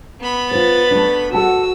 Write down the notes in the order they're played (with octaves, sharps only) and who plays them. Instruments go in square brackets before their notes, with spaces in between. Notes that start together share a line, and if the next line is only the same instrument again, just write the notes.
[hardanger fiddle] B3 B5
[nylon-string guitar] F4 C5 [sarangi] B4 [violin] A6
[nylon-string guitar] A3 D4
[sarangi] F#4 [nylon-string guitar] A4 F#5 A5 [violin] E6